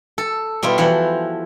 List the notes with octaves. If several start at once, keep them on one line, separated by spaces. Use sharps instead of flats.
A4
B2 G3 E4 F4
E3 F3 F#5